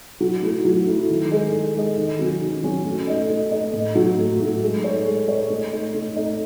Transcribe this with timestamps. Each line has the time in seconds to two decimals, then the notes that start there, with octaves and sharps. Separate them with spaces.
0.21 F#3
0.42 A3 E4 A4
0.65 F#3
0.87 A3 E4 A4
1.09 D#3
1.31 G#3 D#4 A4 D#5
1.53 D#3
1.75 G#3 D#4 A4 D#5
1.97 D#3
2.19 F#3 C#4 F#4
2.41 D#3
2.63 F#3 C#4 F#4
2.85 A3
3.07 D#4 A4 D#5
3.29 A3
3.51 D#4 A4 D#5
3.73 A2
3.95 F#3 A3
4.18 A2
4.40 F#3 A3
4.62 G#3
4.84 D#4 A4 C#5
5.06 G#3
5.28 D#4 A4 C#5
5.50 A3
5.73 D#4 A4
5.94 A3
6.16 D#4 A4